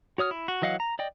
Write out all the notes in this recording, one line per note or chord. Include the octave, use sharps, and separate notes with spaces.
F#4 C#5 D#6 F6
E4
F#4
E3 F#3 D#5 F5 F#5
A#5
D5 D#5 G5